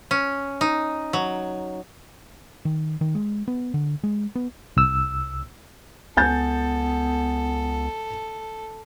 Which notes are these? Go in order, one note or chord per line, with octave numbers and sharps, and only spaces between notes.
C#4
D#4
F#3
D#3
D#3
G#3
B3
D3
G#3
B3
C2 E6
C#2 B3 A4 G#5 G6 A6